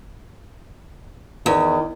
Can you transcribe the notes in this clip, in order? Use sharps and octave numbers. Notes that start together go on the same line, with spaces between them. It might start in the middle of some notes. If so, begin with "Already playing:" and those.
E2 D#3